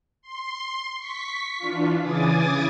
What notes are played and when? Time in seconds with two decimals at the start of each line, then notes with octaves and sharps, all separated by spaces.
0.22 C6
0.97 C#6 B6
1.58 E3 D4 F4
2.01 C#3 E3 G#5 D6 D#6 A6